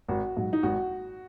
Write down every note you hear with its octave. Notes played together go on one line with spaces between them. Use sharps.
G#1 F#4
G#2 F#3
D#4
G#1 F#4